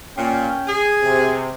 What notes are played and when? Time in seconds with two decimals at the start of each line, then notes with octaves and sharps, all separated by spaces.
0.16 A#2 C#4 G5
0.67 G#4
1.03 C3